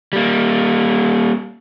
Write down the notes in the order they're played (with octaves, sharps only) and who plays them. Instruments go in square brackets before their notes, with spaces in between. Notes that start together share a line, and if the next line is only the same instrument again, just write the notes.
[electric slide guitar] G3 A#3